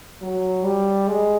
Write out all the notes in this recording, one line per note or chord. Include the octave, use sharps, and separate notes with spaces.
F#3
G3
G#3